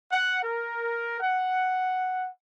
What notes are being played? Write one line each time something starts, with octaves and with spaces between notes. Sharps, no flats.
F#5
A#4
F#5